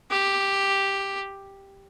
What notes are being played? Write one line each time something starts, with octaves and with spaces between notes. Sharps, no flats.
G4